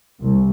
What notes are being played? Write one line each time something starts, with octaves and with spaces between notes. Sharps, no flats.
C2